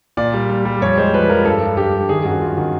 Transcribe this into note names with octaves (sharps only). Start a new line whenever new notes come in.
A#2 D5
G3
G3
G3
F2 C#5
G#3 C5
F3 B4
F3 A#4
G2 A4
G2
G2 G4
G2
D#3 G#4
F#2 F#4
F#2 F4
D#3 F#4